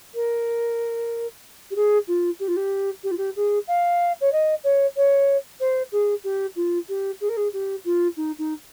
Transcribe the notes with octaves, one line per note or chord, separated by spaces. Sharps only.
A#4
G4
G#4
F4
G4
F4
G4
G4
F4
G4
G#4
F5
C#5
D#5
C#5
C#5
C5
G#4
G4
F4
G4
G#4
A#4
G#4
G4
F4
D#4
D#4